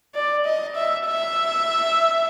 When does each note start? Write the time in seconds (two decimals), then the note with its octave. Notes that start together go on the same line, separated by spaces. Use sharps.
0.15 D5
0.45 D#5
0.76 E5
1.06 E5